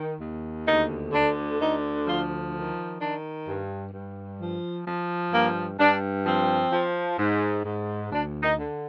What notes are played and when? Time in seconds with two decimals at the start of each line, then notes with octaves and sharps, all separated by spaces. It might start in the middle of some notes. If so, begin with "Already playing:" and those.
Already playing: D#3
0.20 D#2
0.67 D2 D#4
1.13 D3 D4
1.59 D2 D#4
2.06 F3 F4
2.53 D#3
3.00 D#3 D4
3.47 G2
3.92 G2
4.39 F3
4.86 F3
5.32 G2 A#3
5.78 G2 D4
6.25 F3 C4
6.72 F3
7.19 G#2
7.65 G#2
8.12 D2 D4
8.43 D#4
8.59 D3